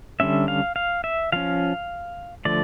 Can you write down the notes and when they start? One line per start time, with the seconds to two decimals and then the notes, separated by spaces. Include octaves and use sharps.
0.20 D3 G3 C#4 E5
0.48 F5
0.76 F5
1.04 E5
1.32 F3 C#4 F5
2.45 D3 F3 A3 D5